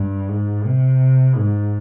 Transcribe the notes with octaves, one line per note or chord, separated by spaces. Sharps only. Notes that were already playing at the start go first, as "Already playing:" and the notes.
Already playing: G2
G#2
C3
G#2